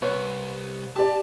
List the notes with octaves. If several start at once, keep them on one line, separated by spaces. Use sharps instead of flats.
C2 B3 C#5
G4 D5 A5